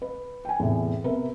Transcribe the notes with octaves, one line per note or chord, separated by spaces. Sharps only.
B4
G5 G#5
E2 A2 C3
C3 B3 A#4 B4 E5